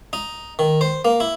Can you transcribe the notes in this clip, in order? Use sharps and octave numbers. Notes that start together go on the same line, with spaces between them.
D#4
D#3
C5
A#3
E4